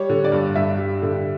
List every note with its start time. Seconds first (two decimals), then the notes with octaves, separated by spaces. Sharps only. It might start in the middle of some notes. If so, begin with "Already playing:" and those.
Already playing: G3 C#5
0.09 D3
0.24 D5
0.32 G2
0.55 G2 E5
0.78 G3
1.02 D3